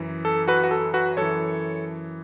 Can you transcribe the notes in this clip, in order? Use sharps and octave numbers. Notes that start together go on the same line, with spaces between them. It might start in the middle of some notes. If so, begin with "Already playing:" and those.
Already playing: F#2 E3
A4
F#4 B4
F#4
A4
F#4 B4
F#2 E3 A4 C#5